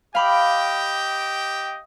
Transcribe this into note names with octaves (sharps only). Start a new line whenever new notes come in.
G4 D#5 F5 G5 B5 D6